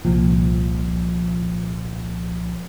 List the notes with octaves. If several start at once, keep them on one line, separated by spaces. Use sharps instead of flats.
C2 A#2 F3